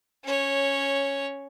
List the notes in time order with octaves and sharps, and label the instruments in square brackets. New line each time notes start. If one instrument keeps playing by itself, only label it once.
[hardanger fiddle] C#4 C#5